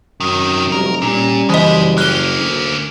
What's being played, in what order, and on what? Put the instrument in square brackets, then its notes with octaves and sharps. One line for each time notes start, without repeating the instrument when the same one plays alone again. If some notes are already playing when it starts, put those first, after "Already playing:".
[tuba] F#2 [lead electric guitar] C3 D#3
[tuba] F1 [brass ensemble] F#3 G3 [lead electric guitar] A#4
[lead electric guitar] A#2 [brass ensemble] G3 [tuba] C#4
[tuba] F#1 [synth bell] E3 D#5 [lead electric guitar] G#3 C5
[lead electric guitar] A#3 C#4 [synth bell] F#6 G7
[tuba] D2